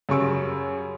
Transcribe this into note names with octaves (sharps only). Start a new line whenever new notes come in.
F#2 C#3 G3 C#6 E6 D7